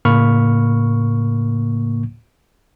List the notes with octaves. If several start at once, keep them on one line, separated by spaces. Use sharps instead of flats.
A2 C#3 A#3 B5 C#6 F6